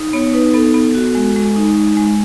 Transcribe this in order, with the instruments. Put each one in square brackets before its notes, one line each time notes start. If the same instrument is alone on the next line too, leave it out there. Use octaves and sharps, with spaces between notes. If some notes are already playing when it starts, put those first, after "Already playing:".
Already playing: [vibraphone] D#4
B3 C#5
D#4 B4
B3 A4
B3
F#4
G#3
G#3
D#4
G#3
G#3